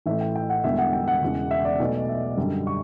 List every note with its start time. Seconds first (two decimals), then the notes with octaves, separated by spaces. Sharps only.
0.06 A1 A2 E3 A3 E5
0.21 G5
0.35 G5
0.50 F#5
0.64 E1 E2 D3 G3 E5
0.78 F#5
0.93 G5
1.08 F#5
1.22 E1 E2 C#3
1.51 E5
1.65 D5
1.80 B1 B2 A3
2.09 E5
2.37 F#2 D3 G3
2.67 C#6